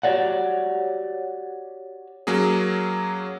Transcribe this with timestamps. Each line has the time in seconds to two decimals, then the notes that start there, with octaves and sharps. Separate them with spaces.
0.03 F#4 G4 A#4 C#5 D5 F#5
2.27 F#3 A#3 C#4 G#4